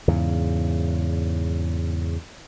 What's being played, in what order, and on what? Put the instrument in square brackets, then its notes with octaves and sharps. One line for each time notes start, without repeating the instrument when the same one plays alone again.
[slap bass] E2 G#2 C#3